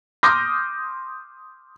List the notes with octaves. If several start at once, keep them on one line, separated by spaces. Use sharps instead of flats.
C6 D6 D#6 F6 G6 A#6